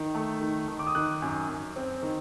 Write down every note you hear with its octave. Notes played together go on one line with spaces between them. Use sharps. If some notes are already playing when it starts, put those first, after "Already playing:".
Already playing: D#3
A3
D#3
D#3
D6
D#6
D#3 F#6
F#2
F#2
C4
D#3